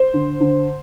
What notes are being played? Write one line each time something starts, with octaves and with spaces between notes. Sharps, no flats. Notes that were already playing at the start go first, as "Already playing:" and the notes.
Already playing: C5
D3
D3